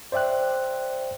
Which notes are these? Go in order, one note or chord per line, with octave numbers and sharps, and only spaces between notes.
C5 D5 E5 G5 F#6